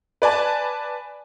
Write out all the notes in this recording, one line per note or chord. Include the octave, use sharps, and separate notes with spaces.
B4 D5 G#5 A5